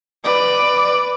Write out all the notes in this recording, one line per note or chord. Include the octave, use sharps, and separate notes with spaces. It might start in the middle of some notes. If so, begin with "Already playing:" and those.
B4 D5